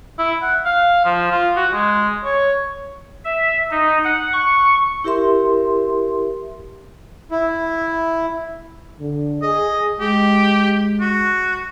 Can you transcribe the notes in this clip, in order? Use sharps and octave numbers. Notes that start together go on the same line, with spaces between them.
E4
F#5
F5
F3
F4
F#4
G#3
C#5
E5
D#4
F#5
C#6
E4 G4 A#4 E5 C6
E4
D3
G#4 D#5
G#3 G4
F#4